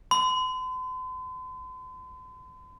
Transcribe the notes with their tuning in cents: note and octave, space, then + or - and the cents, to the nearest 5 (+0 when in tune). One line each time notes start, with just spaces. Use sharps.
C6 -45